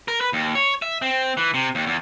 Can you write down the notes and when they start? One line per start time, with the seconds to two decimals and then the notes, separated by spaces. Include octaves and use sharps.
0.08 A#4
0.21 B4
0.33 D#2
0.55 C#5
0.82 E5
1.02 C4
1.37 E3
1.54 C3
1.75 D#2
1.87 E2